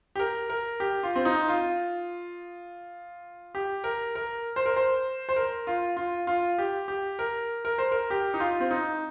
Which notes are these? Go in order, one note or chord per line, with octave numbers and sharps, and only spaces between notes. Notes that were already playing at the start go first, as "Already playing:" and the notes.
G4
A#4
A#4
G4
F4
C4
D#4
F4
G4
A#4
A#4
C5
A#4
C5
C5
A#4
F4
F4
F4
G4
G4
A#4
A#4
C5
A#4
G4
D#4
F4
C4
D#4